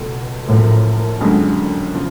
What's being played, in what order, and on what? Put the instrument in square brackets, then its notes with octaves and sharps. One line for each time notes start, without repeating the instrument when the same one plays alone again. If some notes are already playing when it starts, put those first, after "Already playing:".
Already playing: [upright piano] C#2 B2 A3
[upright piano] F#1 F#2 F3 [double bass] A2
[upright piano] F2 D3 F#3 C#4 [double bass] G#3
[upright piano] C#3 F3